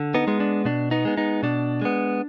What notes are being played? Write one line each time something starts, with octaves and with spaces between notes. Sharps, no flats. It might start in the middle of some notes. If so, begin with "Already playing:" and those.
Already playing: D3
B3 D#4
G#3 B3
D4
B2 D4
B3 D#4
G#3 B3
B3 D#4
B2 D4
G#3 B3